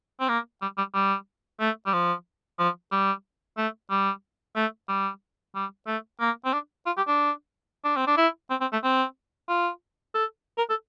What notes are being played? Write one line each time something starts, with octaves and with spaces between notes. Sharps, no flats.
C4
A#3
G3
G3
G3
A3
G3
F3
F3
G3
A3
G3
A3
G3
G3
A3
A#3
C4
D4
F4
G4
D4
D4
C4
D4
E4
C4
C4
A3
C4
F4
A4
A#4
A4